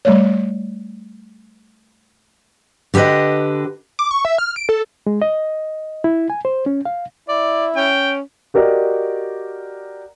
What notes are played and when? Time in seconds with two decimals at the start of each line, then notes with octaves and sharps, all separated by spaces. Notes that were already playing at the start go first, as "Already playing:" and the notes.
0.05 G3 A3 C#5
2.94 D3 G4 A#4 B4 D#5
3.99 D6
4.11 C#6
4.25 E5
4.38 F6
4.56 D7
4.69 A4
5.07 G#3
5.22 D#5
6.04 E4
6.30 G#5
6.45 C5
6.66 C#4
6.85 F5
7.29 E4 D5
7.76 C#4 G5
8.54 F#4 G4 A#4 D5 D#5